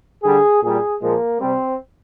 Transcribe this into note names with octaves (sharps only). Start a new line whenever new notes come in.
D3 G3 G#4
A#2 G3 G#4
A#2 F3 G#3 A#3
C3 G3 C4